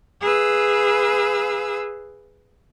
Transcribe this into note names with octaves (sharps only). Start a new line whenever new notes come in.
G#4 B4 F5 E6